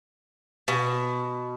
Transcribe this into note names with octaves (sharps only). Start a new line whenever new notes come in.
B2